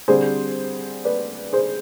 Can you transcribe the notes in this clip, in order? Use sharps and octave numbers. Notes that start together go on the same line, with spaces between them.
D3 G3 C4 G#4 C5
B4 D5
G#4 C5